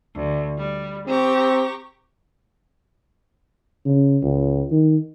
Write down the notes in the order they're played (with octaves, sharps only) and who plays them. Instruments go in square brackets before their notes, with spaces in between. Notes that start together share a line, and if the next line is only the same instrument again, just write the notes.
[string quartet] D2
G3
[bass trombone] C4 [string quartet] G4 A#5 C#6
[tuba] C#3
C#2
D#3